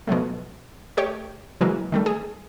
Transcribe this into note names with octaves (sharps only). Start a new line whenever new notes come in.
B2 F3 F#3 A3
A3 G4 C#5
C#3 E3 F#3 G#3 A#3
D#3 G3 A3
G#4